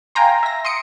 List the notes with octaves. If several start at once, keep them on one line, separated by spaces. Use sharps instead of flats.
F5 G5 G#5 A#5 C6
E5 A#6
C6 D#6 C#7 D7